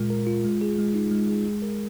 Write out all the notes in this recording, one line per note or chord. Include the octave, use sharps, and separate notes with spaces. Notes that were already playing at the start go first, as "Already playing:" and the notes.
Already playing: A#2 G#3 F4 A#4
A#4
F4
G#3
G#4
G#3
D#4
G#3
G#4
G#3
A#4